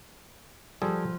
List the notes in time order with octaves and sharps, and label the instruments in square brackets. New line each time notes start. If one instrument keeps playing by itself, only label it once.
[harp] F3 [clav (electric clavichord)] G3 G#4 A4